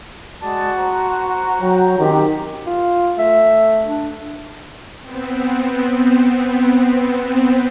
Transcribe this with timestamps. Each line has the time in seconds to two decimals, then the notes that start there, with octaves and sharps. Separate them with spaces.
0.42 G#3 F#4 D5 A5
0.79 C5 A#5
1.62 F#3 G5 A#5
1.99 D#3 C4 C#4 F#4 G4
2.66 F4
3.18 A3 E5
3.85 D4
5.01 B3 C4